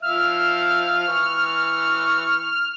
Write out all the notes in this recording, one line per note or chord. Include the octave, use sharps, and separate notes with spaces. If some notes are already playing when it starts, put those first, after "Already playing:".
F3 E5 F5 F6
E3 C#6